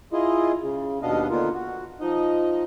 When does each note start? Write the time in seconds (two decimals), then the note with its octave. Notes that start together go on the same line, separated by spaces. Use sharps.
0.13 E4 F4 G#4 D#5
0.62 C#3
1.02 D#2 B2 B3 D4 D#5 F5
1.30 D3 D#3 A#3 B3 F4 A#4
1.54 F#4
2.01 F3 D#4 D#5